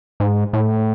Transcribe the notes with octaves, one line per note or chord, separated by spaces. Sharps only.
G#2
A2